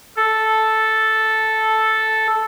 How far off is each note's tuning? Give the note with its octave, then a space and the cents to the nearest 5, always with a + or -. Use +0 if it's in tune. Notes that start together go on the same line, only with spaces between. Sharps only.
A4 -5